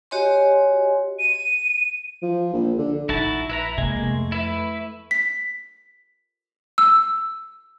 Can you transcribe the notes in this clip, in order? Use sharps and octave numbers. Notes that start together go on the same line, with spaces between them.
F#4 G4 C#5 D#5 G#5 C6
D#7
F3
A#1
D3
A#1 D#4 E4 F#4 A5
E4 B4 E5 A#5
C3 G#3 A#3
F2 A3
E4 B4
B6
E6